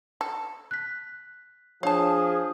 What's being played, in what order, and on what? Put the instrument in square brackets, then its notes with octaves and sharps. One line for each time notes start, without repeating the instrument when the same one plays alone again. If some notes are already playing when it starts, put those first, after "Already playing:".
[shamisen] A4
[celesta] F#6 B6
[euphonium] F3 [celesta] D4 C#5 [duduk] G#4 [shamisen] F5 A5